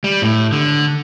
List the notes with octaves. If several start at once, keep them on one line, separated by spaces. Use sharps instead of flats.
G3
A2
D3